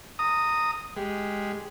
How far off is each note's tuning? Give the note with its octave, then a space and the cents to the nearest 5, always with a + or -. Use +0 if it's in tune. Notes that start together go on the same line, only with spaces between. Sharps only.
A#5 -20 D#6 +0
G#3 +0 G4 +0